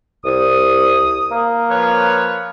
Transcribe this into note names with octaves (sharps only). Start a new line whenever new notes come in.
C2 D#6
A#3
F3 B4 C#5